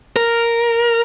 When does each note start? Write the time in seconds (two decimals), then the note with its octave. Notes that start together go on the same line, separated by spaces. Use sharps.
0.16 A#4